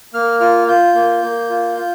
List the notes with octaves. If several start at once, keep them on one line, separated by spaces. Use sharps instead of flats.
A#3 F6
F4 F6
F4 G6
A#3
A#3
F4
F4